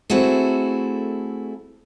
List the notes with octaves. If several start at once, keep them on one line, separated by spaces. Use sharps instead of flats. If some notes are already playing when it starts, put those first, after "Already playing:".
A3 C4 E4 F#4 G#4 A4